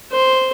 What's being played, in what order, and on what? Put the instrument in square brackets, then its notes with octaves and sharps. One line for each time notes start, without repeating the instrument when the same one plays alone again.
[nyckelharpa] C5